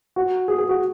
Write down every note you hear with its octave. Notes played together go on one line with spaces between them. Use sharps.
F#4
G#4
G#4
F#4